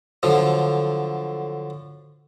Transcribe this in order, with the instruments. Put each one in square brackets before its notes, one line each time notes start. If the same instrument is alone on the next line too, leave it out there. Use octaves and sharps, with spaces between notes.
[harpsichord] D3 F3 F#3